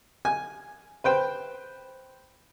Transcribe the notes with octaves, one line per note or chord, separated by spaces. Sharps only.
G#5
B4 C5 G5